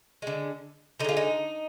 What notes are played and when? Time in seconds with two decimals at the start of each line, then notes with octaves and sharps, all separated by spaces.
0.22 D3 G#3
1.00 D3 D#4
1.04 G#3 F4
1.17 D#4